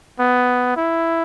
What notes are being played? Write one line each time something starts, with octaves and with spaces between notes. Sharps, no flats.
B3
E4